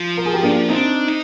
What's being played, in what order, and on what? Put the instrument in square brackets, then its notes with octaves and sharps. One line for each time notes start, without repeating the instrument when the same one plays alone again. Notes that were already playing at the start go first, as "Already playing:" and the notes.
Already playing: [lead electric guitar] F3
[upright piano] A#4
G#4
G4 A#4
A#3 D4
[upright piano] C4 D#4 [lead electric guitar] D4
[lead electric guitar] D#4